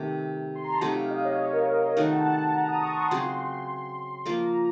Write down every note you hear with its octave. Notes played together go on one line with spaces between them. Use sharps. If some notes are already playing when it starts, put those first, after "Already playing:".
Already playing: C3 D#3 A3
C6
A#5
A5
C3 F#3 A3 D#4 F#5
F5
D#5
C#5
C#5
A#4
D#5
D#3 A3 D#4 F#4 F5
A5
F#5
A5
A#5
D#6
C#6
C6
C#3 F#3 C4 F#4
F3 A#3 F4 A#4 C6
A#5